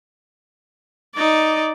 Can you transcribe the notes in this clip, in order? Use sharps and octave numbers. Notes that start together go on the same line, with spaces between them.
D#4 D5